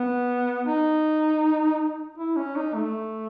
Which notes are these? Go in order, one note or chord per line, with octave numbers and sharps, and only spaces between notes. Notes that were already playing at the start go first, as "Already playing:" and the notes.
Already playing: B3
D#4
E4
C#4
D#4
A3